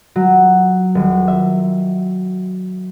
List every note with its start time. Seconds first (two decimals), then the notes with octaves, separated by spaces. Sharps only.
0.16 F#3
0.95 D#1
1.28 E5